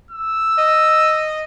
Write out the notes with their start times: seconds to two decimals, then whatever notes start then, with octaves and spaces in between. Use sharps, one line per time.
0.11 E6
0.58 D#5